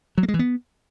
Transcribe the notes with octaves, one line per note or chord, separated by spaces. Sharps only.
F#3
A#3
G#3
E3
B3